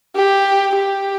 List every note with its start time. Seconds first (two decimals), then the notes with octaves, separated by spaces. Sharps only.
0.16 G4
0.75 G4